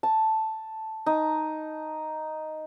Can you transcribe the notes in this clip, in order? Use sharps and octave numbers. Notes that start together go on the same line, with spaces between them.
A5
D#4